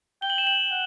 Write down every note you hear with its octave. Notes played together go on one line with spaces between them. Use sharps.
G5 G7
F#7
E7
F#7
F#5